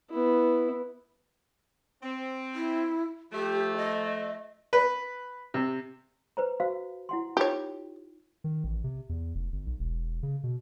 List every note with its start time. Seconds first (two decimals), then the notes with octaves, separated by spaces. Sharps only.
0.11 B3 E4
2.03 C4
2.55 E4
3.33 F3 A3 G4
3.77 D#5
4.73 B4
5.54 C3
6.37 B4 C5 A#5
6.60 F#4 C5 F5
7.09 E4 F#5 C6
7.37 D#4 F4 G4 C#5
8.44 D#3
8.64 A1
8.84 C3
9.09 E2
9.35 F1
9.52 G1
9.67 B1
9.79 E1
10.23 C#3
10.44 B2